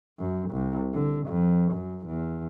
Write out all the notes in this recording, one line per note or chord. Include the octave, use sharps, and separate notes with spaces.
F#2
C2
D3
F2
F#2
E2